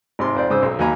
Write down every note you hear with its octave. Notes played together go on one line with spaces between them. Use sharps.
G#1 C3 C6
F2 C5 D5
G#2 C#3 C5 D#6 E6
B1
D#2 F#3 D#5 G#5 A#5 B5